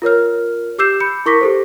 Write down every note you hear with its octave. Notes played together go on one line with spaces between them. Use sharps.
F4 A#4 C#5 F6
G4 D6 E6 G6 C7 E7
B5 G6 C#7
E4 A#4 C#6 D6 A#6 B6
G4 A4 C5